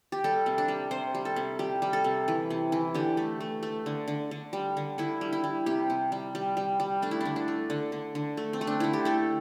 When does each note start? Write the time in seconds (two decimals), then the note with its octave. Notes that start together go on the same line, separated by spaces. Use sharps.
0.12 G4
0.24 G3 A4
0.46 C3
0.58 D4
0.68 G3
0.91 C3 C5
1.15 G3
1.25 A4
1.36 C3
1.59 G3 G4
1.82 G3
1.93 A4
2.04 C3
2.28 E3
2.50 C3
2.72 E3
2.94 D3 G4
3.17 A3
3.40 A3
3.63 A3
3.86 D3
4.08 D3
4.31 D3
4.53 G3
4.77 D3
4.98 D3 E4
5.21 G3
5.33 E4
5.44 G3
5.66 C3 G4
5.90 C3
6.12 G3
6.35 G3
6.57 G3
6.80 G3
7.02 A3 D4
7.11 E4
7.21 D3 D4
7.36 D4
7.48 A3
7.70 D3
7.92 D3
8.15 D3
8.37 A3
8.53 C4
8.61 A3
8.67 D4
8.80 D3 E4
8.93 G4
9.05 A3 A4